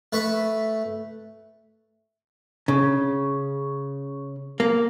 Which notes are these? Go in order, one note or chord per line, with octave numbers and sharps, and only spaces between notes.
A3 B4 B5 C#6
C#3
A#3